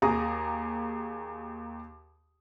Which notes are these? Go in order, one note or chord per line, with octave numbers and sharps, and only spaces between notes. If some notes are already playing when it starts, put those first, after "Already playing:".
D#2 G#4 A#5 D#6